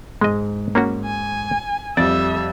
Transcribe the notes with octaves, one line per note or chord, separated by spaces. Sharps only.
G#2 G#3 D#5
A#3 C#4 F#4
G#5
F2 G3 D5 E5 A6